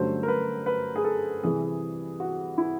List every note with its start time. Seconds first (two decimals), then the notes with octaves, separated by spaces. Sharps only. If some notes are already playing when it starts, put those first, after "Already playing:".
Already playing: G2 D3 F#3 A3 C#4 C5
0.23 A#4
0.28 B4
0.66 B4
0.96 G#4
1.04 A4
1.43 C3 E3 G3 G#4
2.20 F#4
2.58 E4